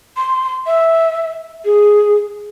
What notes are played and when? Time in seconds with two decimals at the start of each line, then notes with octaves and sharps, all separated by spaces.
0.17 C6
0.66 E5
1.65 G#4